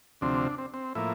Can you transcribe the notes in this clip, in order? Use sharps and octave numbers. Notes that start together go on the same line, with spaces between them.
D2 C3 F3 C4 D4
C4
C4
A2 F3 A#3 E4